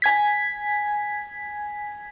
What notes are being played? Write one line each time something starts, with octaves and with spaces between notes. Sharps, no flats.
G#5 G#6 B6